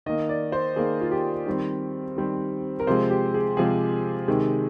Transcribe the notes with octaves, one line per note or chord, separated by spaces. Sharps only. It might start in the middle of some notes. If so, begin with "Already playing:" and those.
D#3 A#3 D#5
D5
C5
D#3 A#3 G#4
F4
G4
D#3 G3 C4
D#3 G3 C4
A#4
C3 F3 G#3 C5
G4
G#4
C3 F3 G#3 G#4
C3 D#3 G#3